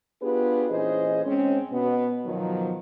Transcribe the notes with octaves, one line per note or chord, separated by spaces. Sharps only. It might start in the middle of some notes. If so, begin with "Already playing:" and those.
B3 D4 F4 G4 G#4 B4
A#2 E3 C#4 G#4 C5 D#5
G#2 G#3 C4 C#4
B2 B3
B2 D#3 F3 F#3